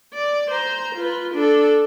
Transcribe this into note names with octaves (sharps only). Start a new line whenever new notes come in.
D5
C5 A#5
F4 B4
D4 A4